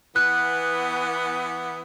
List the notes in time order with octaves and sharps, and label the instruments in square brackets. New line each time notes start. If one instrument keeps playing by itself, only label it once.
[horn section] E3 B3 [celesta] F#6